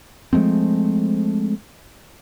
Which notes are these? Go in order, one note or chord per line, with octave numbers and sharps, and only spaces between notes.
F3 G#3 A3 C4